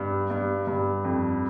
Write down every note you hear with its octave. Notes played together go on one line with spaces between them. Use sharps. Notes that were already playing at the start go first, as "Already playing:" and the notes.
Already playing: G2
G2
G2
F2